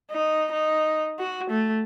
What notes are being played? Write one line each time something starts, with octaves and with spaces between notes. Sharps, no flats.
D#4
D#4
F#4
A3